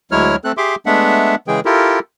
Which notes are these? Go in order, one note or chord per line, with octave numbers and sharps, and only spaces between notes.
D2 F#3 G#3 E4 C#5 F6
A3 C4 A4 F#6
G4 G#4 E5 C6 D6
G#3 A3 B3 D4 E5 F#5
C#3 E3 G#3 G#4 G5
E4 F4 G4 A4 A#4